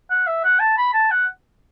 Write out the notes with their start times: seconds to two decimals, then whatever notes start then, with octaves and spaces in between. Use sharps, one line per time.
0.11 F#5
0.27 E5
0.44 F#5
0.60 A5
0.78 B5
0.94 A5
1.11 F#5